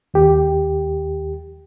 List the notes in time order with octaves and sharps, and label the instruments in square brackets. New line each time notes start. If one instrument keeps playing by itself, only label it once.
[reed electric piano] D#2 G4